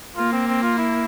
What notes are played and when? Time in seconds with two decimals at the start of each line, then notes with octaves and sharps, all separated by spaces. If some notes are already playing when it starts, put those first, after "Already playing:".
0.17 A#3 F4
0.33 C4
0.47 C4
0.63 F4
0.78 E4